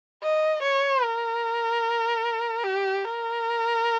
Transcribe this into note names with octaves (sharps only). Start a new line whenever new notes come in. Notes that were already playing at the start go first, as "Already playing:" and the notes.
D#5
C#5
A#4
G4
A#4